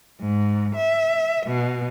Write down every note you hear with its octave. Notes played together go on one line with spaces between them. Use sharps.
G#2
E5
B2